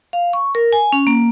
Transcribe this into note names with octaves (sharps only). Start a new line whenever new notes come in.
F5
C#6
A#4
G#5
C#4
A#3